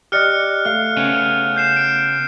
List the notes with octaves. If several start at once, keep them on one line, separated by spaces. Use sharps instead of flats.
G4 D5 D#5 F6 F#6 C#7
A3 F5 F6
C#3 B3 C#4
G6 C7 E7
D7